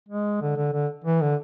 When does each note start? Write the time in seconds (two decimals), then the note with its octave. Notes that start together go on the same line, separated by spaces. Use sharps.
0.09 G#3
0.41 D3
0.56 D3
0.73 D3
1.04 E3
1.21 D3